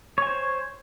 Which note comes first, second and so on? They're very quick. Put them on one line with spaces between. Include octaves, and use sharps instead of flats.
C#5 G#5 C5